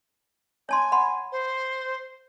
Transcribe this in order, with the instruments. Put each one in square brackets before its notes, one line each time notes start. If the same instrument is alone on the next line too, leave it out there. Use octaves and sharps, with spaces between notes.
[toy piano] C#5 A5 C6 [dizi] G#5
[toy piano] F#5 B5 C6
[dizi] C5